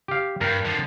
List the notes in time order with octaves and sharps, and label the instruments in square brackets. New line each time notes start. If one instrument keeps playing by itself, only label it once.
[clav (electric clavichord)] G4 F5
[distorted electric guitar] G2 [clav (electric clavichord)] A#4 G5
[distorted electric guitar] D3 F3